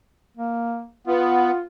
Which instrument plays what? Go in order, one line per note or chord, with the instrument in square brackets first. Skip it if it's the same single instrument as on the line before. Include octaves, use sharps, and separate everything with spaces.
[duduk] A#3
[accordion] B3 [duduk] F4